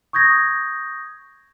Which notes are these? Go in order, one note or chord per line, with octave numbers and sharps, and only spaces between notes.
C#6 D#6 G6 G#6 A#6